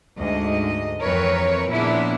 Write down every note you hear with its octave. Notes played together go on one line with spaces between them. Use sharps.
D2 G#2 D#5
F2 E3 C4 A#4 B4 C#5
A#2 C#3 F3 B3 D4 E4